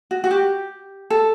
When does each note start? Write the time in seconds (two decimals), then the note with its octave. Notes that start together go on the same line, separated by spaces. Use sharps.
0.11 F#4
0.24 F#4
0.31 G4
1.10 A4